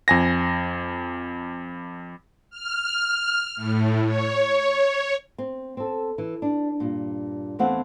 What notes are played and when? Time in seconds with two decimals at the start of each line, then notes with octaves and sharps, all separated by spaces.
0.08 F2 G#5 A#6
2.51 F6
3.56 A2
4.05 C#5
5.38 C4
5.77 C4 A4
6.18 E3
6.42 D4
6.80 G2 A#2
7.59 E2 E3 A3 C4 F5 F#5